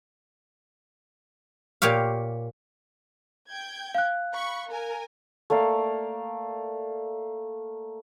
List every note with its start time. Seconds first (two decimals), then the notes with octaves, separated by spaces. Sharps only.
1.82 A#2 G4 C#5 F5
3.49 G5 G6 G#6
3.95 F5 F#6
4.34 B5 C#6
4.69 A#4 G#5
5.50 A3 A#3 D5 F5